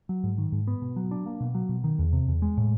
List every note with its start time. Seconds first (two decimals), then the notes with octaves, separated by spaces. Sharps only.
0.09 F#3
0.24 G#2
0.38 D#3
0.52 G#2
0.67 B3
0.82 B2
0.96 F#3
1.11 D4
1.26 A#3
1.40 B2
1.55 F#3
1.69 B2
1.84 D#3
1.99 E2
2.13 C3
2.28 E2
2.42 G#3
2.57 A2